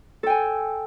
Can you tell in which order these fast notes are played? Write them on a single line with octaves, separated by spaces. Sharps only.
A4 G5 G#5